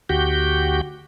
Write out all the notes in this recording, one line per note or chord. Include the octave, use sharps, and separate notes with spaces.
D2 F#4 G4 G6